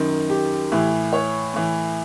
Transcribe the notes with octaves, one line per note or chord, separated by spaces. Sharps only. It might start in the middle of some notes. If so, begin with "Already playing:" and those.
Already playing: F#2 D#3
G4
A2 E3
C#5
A2 E3